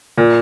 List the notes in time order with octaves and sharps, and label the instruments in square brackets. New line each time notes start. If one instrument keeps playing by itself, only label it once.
[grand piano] A#2